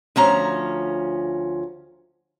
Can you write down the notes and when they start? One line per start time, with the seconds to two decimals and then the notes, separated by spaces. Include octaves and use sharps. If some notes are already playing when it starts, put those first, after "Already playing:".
0.16 D2 F3 C#4 A#5